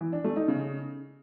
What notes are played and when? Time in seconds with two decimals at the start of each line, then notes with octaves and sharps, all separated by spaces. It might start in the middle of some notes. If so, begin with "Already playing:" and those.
0.01 E3
0.13 D4
0.24 A3
0.36 D#4
0.48 C#3